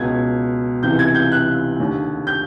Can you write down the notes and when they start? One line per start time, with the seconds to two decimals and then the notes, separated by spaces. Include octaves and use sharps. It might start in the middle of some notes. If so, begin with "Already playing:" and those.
Already playing: C#2 B2 G#6
0.83 C#2 C3 E3 G6
0.99 G#6
1.15 G6
1.32 F#6
1.80 D#2 D3
2.27 G6